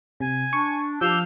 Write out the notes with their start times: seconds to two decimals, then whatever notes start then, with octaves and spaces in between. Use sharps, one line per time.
0.20 C3 G#5
0.53 D4 C#6
1.01 F3 D4 G4 F5 E6 G6